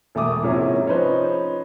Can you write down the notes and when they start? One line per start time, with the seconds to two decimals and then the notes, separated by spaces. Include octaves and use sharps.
0.15 E1 A3 A#3 D6 D#6
0.42 G#2 C3 F3 A#3 C#4 E4
0.86 F3 C#4 D#4 B4 C5